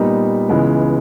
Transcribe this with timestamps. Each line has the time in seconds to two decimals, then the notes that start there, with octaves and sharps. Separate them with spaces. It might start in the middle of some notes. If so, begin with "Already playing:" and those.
Already playing: A#2 G3 B3 D#4
0.49 C#2 C#3 E3 G#3 B3